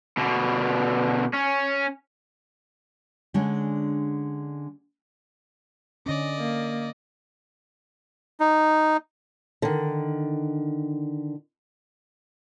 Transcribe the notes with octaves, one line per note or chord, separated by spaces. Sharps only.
B2 D3
C#4
D3 G#3 C#4 D4
D3 C#4 D5 D#5
A#3
D#4
D3 D#3